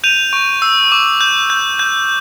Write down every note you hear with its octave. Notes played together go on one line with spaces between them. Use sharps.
G6 D#7 F7
C#6
E6
D6
G6
G6
G6